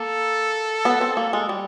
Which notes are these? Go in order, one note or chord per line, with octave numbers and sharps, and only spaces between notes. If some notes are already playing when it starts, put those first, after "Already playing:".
Already playing: A#3 A4
B3
C4
A#3
G#3
G3